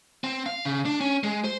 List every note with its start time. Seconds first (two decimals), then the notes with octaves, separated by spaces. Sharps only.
0.24 C4
0.46 F5
0.65 C#3
0.85 D4
1.01 C#4
1.23 G#3
1.44 C5